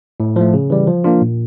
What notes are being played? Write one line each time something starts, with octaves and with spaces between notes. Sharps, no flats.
A2
F3 A3
C#3
E3 G3
F3
A#3 D4 F4
A#2